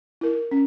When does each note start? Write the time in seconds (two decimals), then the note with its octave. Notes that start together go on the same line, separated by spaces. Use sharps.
0.21 E4 A#4
0.51 C#4